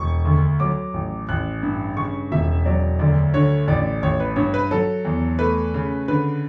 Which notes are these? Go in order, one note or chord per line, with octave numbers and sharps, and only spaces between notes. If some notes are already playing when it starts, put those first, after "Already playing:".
Already playing: E1 C#6
D2
F#3 D6
A1
A1 F#6
G2
C#3 C#6
E1 E5
F#3 D5
D2 D5
D3 C#5
A1 D5
A1 C#5
B4
G2 C#5
B4
F#3 A4
E2
A3 B4
C#3
D3 B4